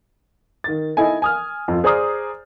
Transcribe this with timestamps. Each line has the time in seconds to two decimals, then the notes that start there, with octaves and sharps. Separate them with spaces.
0.64 D#3 A6
0.97 D#4 E4 A4 D#5 G#5
1.22 G#5 D#6 F6
1.68 F2 F4
1.84 G#4 C5 D5 A#5 D#6 F6